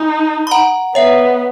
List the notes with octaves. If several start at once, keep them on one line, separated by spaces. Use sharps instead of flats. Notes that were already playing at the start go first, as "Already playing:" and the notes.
Already playing: D#4 G#5 B5
B5
F#5 A#5
B3 C#5 E5